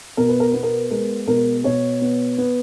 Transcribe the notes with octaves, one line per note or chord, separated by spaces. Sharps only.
B2 A#4
B4
A#4
B3 B4
A#4
G#3 A#4
B2 A#4
B2 C#5
B3
B3